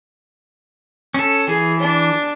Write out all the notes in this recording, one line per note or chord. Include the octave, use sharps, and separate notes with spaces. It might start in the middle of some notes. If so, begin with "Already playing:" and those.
C#4 A4
E3 G#4
D4